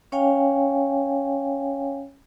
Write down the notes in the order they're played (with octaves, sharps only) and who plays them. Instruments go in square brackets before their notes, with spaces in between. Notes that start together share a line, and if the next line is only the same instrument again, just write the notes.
[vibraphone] C#4 C#5 F5 G5 G#5